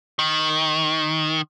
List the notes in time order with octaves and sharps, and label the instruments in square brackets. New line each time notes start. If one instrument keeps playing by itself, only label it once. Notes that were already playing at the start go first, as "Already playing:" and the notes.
[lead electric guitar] D#3